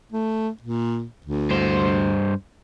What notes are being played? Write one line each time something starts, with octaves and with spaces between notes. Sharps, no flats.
A3
A#2
D2
G2 C5